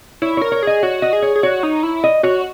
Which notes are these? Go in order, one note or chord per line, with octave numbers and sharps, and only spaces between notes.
E4 C#5
A#4 C#5
C#5
G#4 D#5
F#4 C#5
D#5
G#4
C#5
G#4
F#4 C#5
D#4
E4
D#5
F#4 C#5